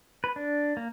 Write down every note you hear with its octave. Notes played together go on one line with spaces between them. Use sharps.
B4
D4
A#3